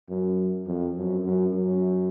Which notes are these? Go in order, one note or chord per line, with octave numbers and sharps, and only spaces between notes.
F#2
F2
F#2
F#2
F#2